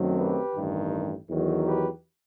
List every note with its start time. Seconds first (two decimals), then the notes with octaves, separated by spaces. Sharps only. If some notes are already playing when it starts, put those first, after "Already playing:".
Already playing: F#2 D#3 F#3 A3 C4
0.17 G4 B4
0.55 A1 G2 D#3
1.29 E2 D#3 F#3
1.66 G4 B4